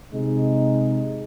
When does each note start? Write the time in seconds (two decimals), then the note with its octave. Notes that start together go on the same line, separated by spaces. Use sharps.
0.12 C3 G#3 D#4